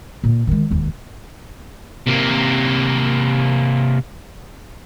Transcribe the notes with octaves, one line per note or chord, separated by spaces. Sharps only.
A#2
D#3 G#3
E1 D#2
C3 A#3